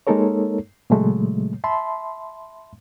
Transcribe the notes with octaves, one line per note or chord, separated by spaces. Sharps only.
G#3 A#3 D#4 A4 A#4 C#5
A#2 C#3 F#3 G#3 A3
E5 A5 B5 C6